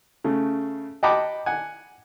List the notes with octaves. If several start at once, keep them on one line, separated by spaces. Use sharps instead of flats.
C#3 A3
D#5 F#5 G5 A5 B5 D6
F#5 G#5